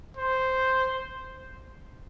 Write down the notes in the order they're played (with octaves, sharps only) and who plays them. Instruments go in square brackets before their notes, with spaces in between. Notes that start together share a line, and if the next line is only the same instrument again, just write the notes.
[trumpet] C5